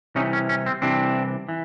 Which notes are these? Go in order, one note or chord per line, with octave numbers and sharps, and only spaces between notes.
C2 C3 E3 C#4 D#4
C#4
C#4
C4
C2 C3 E3 C4 D4
E3